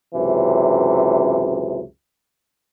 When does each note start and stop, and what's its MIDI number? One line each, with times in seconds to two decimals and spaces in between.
0.15 1.82 37
0.15 1.82 42
0.15 1.82 48
0.15 1.82 52